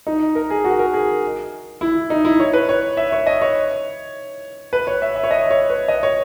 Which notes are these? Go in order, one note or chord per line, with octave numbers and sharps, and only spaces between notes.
D#4
A#4
G#4
F#4
A#4
G#4
E4
D#4
E4
C#5
B4
C#5
E5
C#5
D#5
C#5
B4
C#5
E5
E5
C#5
D#5
C#5
B4
D#5
C#5